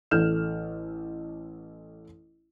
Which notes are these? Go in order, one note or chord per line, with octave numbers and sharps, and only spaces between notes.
A1 A4 F6 G6 E7